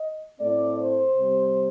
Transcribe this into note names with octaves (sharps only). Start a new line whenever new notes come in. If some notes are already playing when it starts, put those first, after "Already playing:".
Already playing: D#5
A2 A3 C4 D5
C5
C3 G3 C4